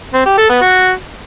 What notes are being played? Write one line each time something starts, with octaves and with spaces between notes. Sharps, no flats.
C4
G4
A4
B3
F#4